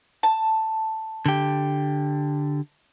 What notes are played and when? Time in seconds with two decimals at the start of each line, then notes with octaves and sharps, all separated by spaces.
0.23 A5
1.26 D3 G4